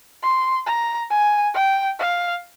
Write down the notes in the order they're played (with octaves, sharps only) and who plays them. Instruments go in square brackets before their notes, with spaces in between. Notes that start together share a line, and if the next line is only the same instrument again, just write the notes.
[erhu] C6
A#5
G#5
G5
F5